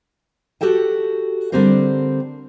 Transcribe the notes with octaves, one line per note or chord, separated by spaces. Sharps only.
F#4 G4 A4 G5 A5
D3 G3 C4 G4 A#4 C5